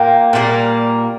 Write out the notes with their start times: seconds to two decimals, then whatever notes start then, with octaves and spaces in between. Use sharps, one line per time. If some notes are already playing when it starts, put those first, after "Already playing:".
Already playing: A#2 A#3 G5
0.33 A#2 G3 A#3